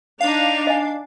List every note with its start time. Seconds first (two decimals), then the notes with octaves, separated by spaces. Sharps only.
0.21 D4 D#4 F5 F7
0.67 D#5 G#5